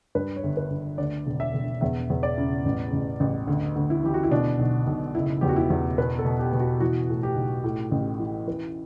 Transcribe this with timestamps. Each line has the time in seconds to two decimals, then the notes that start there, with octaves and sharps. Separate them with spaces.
0.15 G2 B4
0.36 C#5
0.43 G1
0.57 B4
0.70 G1
0.98 D2 D5
1.26 E1
1.40 E5
1.54 E1
1.81 E2 E5
2.10 E2
2.23 D5
2.37 C#3
2.65 A1
2.93 A1
3.20 A1
3.47 D2
3.76 D2
3.90 E4
4.03 E3 G4
4.14 F#4
4.23 E4
4.31 B2 D4
4.59 B1
4.87 B1
5.15 F#1 E4
5.41 E2 G4
5.49 F#4
5.56 E4
5.70 E2
5.98 B2 B4
6.19 A4
6.25 B2
6.40 G4
6.53 B2
6.60 F#4
6.80 E3 F#4
7.09 A2
7.23 G4
7.36 B1
7.64 A2
7.91 A1
8.19 E3
8.47 E3 B4